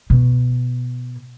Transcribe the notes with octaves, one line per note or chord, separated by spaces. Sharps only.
B2